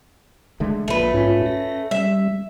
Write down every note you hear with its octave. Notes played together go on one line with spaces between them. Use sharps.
D3 G#3 A3
A#1 A#2 A3 B4
G#2 C#4 F4
A#6
G3 E5